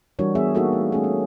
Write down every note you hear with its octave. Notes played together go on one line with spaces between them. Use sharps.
E3 G3 D4 F#4 A#4 C#5
B3 G#4 E5
A#3 B3 D#4 F#4 G4 A4
A3
A3 C#4 G#4
C#4